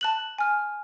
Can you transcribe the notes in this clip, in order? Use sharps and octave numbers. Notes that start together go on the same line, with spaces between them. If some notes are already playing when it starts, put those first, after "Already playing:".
A5 F#6 F#7
G#5 F6